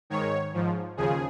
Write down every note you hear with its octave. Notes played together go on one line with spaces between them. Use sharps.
G#2 D#3 C#5
G#2 F3
D#2 C#3 F3 G#4